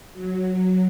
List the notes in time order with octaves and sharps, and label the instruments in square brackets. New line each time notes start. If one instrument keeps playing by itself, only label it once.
[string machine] F#3